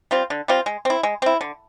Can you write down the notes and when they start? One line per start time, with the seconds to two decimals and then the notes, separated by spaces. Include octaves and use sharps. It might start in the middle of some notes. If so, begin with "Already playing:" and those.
0.11 G3 C4 F4
0.30 D3
0.48 G3 C4 F4
0.66 G#3
0.85 C4 E4
1.03 G#3
1.22 C4 E4
1.41 D3